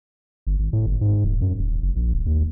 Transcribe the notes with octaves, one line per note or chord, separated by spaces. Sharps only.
G1
G#1
A2
G1
G#2
D#1
F#2
D#1
F#1
A#1
D1
D#2